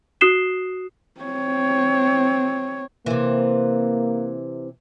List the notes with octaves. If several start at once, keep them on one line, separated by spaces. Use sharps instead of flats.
F#4 D#6 F#6 C7 E7 G7
C4 C#5
C3 E3 A#3